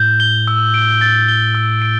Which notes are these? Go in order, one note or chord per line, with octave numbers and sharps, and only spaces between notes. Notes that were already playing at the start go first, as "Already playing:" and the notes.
Already playing: A2 G6
G7
E6
D7
A6
G7
E6
D7